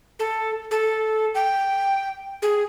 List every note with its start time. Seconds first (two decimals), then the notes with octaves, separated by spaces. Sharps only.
0.19 A4
0.71 A4
1.35 G5
2.42 G#4